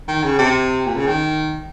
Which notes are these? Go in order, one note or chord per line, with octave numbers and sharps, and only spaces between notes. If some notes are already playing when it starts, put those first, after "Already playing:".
D#3
C#3
C3
A#2
C#3
D#3